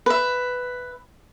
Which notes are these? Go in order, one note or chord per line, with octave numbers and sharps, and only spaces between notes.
B4 E5